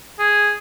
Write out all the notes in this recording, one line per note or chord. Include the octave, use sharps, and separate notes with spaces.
G#4